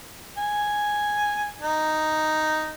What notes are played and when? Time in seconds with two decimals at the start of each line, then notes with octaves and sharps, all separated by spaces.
0.37 G#5
1.62 D#4